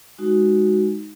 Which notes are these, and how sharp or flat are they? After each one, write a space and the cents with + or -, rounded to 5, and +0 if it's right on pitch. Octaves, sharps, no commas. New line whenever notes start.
G#3 +0 D#4 +0 F#4 +0